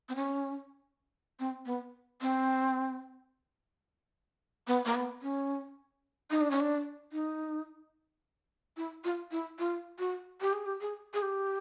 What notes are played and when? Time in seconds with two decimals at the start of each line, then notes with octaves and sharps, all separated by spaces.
0.09 C4
0.15 C#4
1.39 C4
1.66 B3
2.21 C4
4.67 B3
4.86 A#3
4.95 B3
5.22 C#4
6.31 D#4
6.41 D4
6.51 C#4
6.60 D4
7.12 D#4
8.77 E4
9.04 F4
9.31 E4
9.59 F4
9.99 F#4
10.41 G4
10.53 G#4
10.66 G4
10.81 G#4
11.14 G#4
11.22 G4